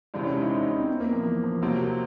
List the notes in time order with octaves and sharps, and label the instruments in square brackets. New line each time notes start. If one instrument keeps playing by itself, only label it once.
[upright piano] C#2 C3 E3 G#3 [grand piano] D4
[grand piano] C#4
D#4
E4
D#4
C#4
C4
B3
A#3
F3
E3
F3
[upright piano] C3 F3 A#3 [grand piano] F#3